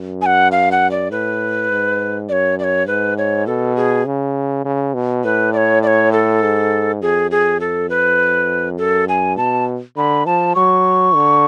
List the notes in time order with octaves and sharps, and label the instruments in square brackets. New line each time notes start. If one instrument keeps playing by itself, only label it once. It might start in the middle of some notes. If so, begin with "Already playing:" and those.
Already playing: [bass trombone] F#2
[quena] G#5
F#5
F5
F#5
D5
[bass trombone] A2 [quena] B4
[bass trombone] G#2
[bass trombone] F#2 [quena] C#5 D5
[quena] D5
C#5
[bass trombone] G#2 [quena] B4
[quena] C#5
[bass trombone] B2 [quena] A4
[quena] G#4
[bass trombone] C#3
C#3
B2
[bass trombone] A2 [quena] B4
[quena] D5
C#5
D5
C#5
A4
[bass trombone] G#2
[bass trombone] F2 [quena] G#4
[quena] G#4
A4
B4
[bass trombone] F#2 [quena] A4
[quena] G#5
[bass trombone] B2 [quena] A5
[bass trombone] D3 [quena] B5
[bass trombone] F3 [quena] A5
[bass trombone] F#3 [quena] C#6
[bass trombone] D3